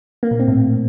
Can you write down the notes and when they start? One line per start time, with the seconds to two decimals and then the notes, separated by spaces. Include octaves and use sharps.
0.23 A#3
0.31 A#2
0.40 C4
0.48 A2